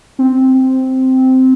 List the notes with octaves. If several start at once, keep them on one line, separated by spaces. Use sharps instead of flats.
C4